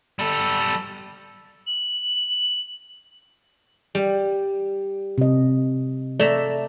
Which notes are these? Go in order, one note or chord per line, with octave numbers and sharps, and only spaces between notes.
G3 A4
F#7
G3
C3 D#5
A3 D5 E5 A#5